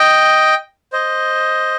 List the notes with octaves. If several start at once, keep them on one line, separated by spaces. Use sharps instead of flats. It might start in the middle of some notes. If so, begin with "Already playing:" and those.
Already playing: D#5 G5
C5 D#5